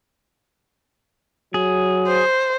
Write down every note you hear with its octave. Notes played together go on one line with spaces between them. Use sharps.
F#3 G#4
C5